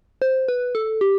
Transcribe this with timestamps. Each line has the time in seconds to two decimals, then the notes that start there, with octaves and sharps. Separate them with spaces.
0.22 C5
0.48 B4
0.75 A4
1.01 G4